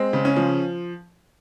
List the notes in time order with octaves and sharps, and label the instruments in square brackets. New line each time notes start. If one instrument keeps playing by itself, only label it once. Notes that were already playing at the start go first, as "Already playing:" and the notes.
Already playing: [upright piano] G#3 C4
C#3
C#4
F3